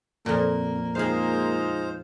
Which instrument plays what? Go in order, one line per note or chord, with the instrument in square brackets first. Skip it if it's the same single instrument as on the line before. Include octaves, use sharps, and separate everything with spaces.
[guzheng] F2 A#2 [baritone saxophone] A#3
[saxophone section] G#3 D#4 F4 [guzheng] G#4 F5 [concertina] C5